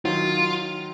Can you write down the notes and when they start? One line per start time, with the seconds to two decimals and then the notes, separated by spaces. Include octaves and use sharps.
0.05 D#3 F#3 F4